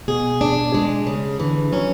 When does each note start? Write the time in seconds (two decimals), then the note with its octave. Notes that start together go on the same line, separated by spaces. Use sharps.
0.08 B2 G#4
0.41 D4
0.74 G#3
1.07 C#3
1.40 D3 E3
1.73 F#3 C#4